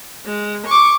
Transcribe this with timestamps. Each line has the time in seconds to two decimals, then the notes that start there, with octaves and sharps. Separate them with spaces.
0.25 G#3
0.66 C#6 D6